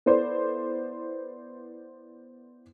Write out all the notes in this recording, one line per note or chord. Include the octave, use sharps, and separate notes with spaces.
B3 E4 A4 C5 D5